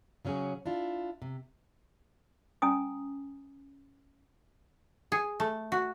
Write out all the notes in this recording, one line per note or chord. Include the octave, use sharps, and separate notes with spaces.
C#3 F#3 C#4 F#4 G#4
D4 E4 F4
C3
C#4 G#5 A#5 D#6
G#4
A3
F#4